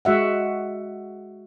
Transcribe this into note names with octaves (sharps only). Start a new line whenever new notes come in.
G#3 F#4 E5 F#5